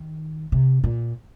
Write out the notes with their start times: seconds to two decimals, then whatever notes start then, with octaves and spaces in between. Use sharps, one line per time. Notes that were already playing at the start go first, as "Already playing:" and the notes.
Already playing: D#3
0.52 C3
0.84 A#2